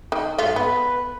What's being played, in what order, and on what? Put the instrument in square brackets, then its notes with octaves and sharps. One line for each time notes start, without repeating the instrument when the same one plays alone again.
[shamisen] D#3
[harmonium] G#2 [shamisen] A3 F4 F#4
[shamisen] B3 [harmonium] B4